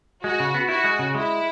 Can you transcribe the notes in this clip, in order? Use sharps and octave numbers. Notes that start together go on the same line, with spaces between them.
G#3 F#4
C#3
B3
E4 F#4
G#3
C#3
G#3 E4